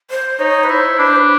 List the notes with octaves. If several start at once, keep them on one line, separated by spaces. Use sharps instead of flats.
C5
D#4 C#5
B4
E4 C5
D4 B4
C5
B4